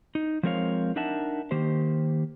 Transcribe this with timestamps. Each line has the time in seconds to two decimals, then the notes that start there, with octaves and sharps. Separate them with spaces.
0.15 D#4
0.43 F3 G#3 C4 A#4 C#5 F5
0.96 D4 D#4 A#4 E5 F#5 A5
1.51 D#3 A#3 G4 C5